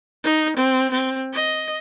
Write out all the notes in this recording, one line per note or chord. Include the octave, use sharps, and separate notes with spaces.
D#4
C4
C4
D#5